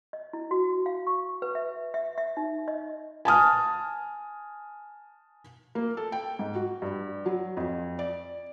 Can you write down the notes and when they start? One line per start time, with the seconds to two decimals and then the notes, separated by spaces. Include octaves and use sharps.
0.13 D#5
0.33 E4
0.51 F#4
0.86 F5
1.07 C#6
1.42 B4
1.55 E5
1.94 E5
2.18 E5
2.37 D#4
2.68 D#5
3.25 G#5 A5 D#6 F6
5.75 A#3
5.97 A4
6.12 G5
6.39 G#2
6.55 F#4
6.82 G2
7.26 F#3
7.57 F2
7.99 D5